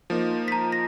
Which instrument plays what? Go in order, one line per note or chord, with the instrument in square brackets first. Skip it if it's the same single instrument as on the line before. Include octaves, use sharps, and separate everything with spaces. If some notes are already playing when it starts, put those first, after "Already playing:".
[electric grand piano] F3 A#3 D#4
[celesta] A#5 B6
A#6